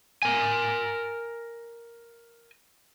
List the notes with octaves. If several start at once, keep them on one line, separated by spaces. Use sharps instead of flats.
A#4 G#5